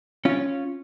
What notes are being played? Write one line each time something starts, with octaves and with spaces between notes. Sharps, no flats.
C#4 F4